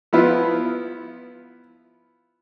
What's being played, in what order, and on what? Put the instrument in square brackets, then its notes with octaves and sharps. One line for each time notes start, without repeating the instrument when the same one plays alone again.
[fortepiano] F3 B3 E4 F4